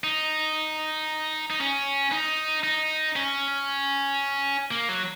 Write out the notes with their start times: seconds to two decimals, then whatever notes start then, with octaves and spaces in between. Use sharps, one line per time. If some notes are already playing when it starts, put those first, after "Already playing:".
0.04 D#4
1.51 D#4
1.61 C#4
2.12 D#4
2.63 D#4
3.16 C#4
4.71 A#3
4.89 F#3